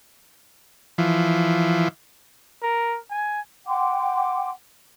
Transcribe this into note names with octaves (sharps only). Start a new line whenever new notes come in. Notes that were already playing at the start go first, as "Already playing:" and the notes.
E3 F3
A#4
G#5
F#5 G5 C6 D6